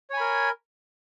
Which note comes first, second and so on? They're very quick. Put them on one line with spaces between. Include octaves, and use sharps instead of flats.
C#5 G#5 B5 A#4